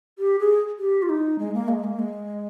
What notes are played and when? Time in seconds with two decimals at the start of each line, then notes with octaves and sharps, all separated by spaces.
0.19 G4
0.39 G#4
0.78 G4
1.02 F4
1.09 D#4
1.39 G#3
1.54 A#3
1.68 G#3
1.84 A#3
1.99 G#3